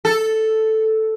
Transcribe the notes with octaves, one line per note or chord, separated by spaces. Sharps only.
A4